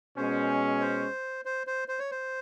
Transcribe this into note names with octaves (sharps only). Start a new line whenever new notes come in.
B2 G#3 C#4 C5
C#5
C5
C5
C5
C5
C#5
C5